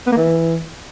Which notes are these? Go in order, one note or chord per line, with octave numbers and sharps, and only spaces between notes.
B3
A#3
E3